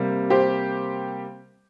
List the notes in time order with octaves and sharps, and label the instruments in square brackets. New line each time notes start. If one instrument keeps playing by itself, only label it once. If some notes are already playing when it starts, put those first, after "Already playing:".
Already playing: [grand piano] C3 G3 A#3
[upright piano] G4 C5